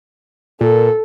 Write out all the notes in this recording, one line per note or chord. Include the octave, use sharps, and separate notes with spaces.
A#2 A4